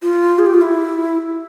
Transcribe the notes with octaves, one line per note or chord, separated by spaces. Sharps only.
F4
G#4
G4
F4
E4